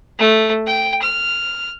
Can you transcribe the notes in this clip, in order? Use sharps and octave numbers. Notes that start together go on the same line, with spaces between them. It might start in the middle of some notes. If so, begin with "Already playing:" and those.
A3
G5
F6